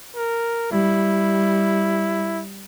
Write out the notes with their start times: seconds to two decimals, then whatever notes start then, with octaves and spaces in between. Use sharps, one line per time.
0.16 A#4
0.72 G3 E4